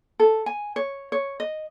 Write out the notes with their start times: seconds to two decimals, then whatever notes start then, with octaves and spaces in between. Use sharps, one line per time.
0.20 A4
0.46 G#5
0.76 C#5
1.12 C#5
1.40 D#5